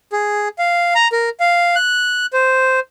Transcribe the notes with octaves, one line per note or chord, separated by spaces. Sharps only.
G#4
F5
A#5
A#4
F5
F#6
C5